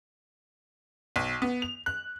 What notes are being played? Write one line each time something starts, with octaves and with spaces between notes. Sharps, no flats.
B1
B3
F7
F#6